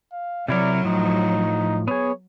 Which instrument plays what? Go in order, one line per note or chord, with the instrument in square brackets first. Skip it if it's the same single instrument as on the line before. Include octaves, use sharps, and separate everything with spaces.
[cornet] F5
[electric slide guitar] C3 E4 A#4 [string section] F#3 [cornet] D5
[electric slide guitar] A2 F3 [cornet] D#4
[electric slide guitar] B3 G#4 [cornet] C#5